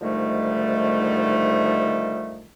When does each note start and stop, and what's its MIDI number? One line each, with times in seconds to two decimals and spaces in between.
0.02 2.49 44
0.02 2.49 50
0.02 2.49 51
0.02 2.49 53
0.02 2.49 55
0.02 2.49 57